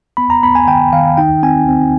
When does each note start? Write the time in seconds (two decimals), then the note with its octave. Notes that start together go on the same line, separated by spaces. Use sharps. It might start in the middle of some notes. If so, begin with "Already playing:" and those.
0.17 B3 B5
0.30 A#5
0.43 B3 B5
0.55 G#5
0.67 D#3 G5
0.93 D#3 F5
1.17 D#4 G5
1.43 C4 G#5
1.68 C4